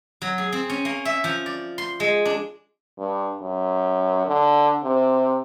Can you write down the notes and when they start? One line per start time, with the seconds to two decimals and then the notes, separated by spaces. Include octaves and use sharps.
0.22 F#3
0.38 G#4
0.52 C4
0.69 C#4
0.85 A#3
1.05 E5
1.24 F3
1.46 D5
1.78 C6
2.00 G#3
2.25 D4
2.98 G2
3.41 F#2
4.27 D3
4.83 C3